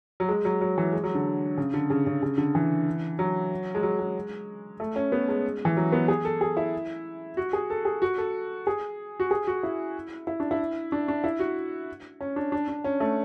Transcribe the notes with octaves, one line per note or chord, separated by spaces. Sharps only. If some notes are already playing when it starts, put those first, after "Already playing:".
F#3
G#3
F#3
F#3
E3
G#3
F#3
D3
C#3
D3
C#3
C#3
C#3
D3
E3
F#3
G#3
F#3
G#3
A3
C#4
B3
G#3
E3
F#3
B3
G#4
A4
G#4
E4
F#4
G#4
A4
G#4
F#4
A4
G#4
F#4
G#4
F#4
E4
E4
D4
E4
D4
D4
E4
F#4
C#4
D4
D4
D4
C#4
A3